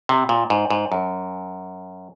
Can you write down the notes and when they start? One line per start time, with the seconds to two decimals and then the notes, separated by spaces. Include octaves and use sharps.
0.09 C3
0.29 A#2
0.50 G#2
0.70 G#2
0.92 F#2